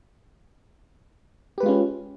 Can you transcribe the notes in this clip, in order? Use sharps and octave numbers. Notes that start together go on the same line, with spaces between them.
G#3 C#4 F4 G4 B4